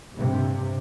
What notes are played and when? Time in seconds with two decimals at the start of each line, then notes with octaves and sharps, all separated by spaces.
0.14 G2 C3